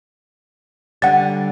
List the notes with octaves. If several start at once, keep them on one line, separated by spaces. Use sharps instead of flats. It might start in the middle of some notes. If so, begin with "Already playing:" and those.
D3 G3 F#5 A6